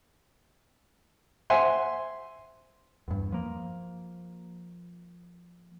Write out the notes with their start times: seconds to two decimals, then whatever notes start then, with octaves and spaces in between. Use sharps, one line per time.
1.50 C5 E5 F#5 G#5 C6
3.08 E2 G2
3.32 F3 A#3